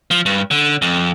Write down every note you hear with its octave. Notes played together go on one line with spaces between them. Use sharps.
F3
G2
D3
F2